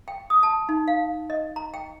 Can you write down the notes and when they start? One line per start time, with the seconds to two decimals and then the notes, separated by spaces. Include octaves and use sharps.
0.08 G5
0.30 D#6
0.43 A5
0.69 D#4
0.88 F5
1.30 D#5
1.56 A#5
1.74 G5